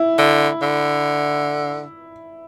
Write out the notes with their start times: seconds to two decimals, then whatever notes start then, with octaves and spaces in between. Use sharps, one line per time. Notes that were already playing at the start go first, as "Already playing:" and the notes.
Already playing: E4
0.18 D3
0.62 D3